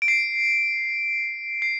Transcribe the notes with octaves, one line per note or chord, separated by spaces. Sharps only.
D7
C7
C7